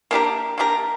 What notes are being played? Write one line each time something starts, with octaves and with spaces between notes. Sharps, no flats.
A#3 D4 G4 A#4
A#3 D4 G4 A#4